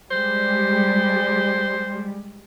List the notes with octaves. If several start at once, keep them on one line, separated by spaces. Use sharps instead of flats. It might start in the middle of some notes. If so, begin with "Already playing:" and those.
G3 G#3 C5